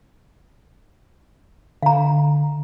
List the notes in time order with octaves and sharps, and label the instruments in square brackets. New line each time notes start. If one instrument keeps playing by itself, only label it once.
[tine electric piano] D3 [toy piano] F5 A#5